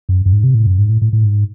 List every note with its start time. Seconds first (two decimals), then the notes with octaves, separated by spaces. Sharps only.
0.09 F#2
0.26 F#2
0.32 G#2
0.44 C3
0.55 A2
0.66 F#2
0.79 G#2
0.89 A2
1.02 A2
1.13 A2
1.24 G#2